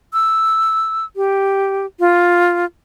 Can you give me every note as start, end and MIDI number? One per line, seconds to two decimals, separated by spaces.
0.13 1.05 88
1.16 1.86 67
2.00 2.65 65